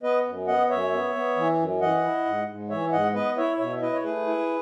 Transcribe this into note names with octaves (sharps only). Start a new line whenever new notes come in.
B3 B4 D#5
F#2
B3 D#5 F#5
F#2 C#5 E5
B3
B3
E3
F#2
E3 D#5 F#5
E4
G#2
G#2
E3 C#5 E5
G#2 D#5 F#5
B3 B4 D#5
E4 C#5 E5
B2 C#5 E5
E5
E4 B4 D#5
C#5
A3 G#4 B4
E4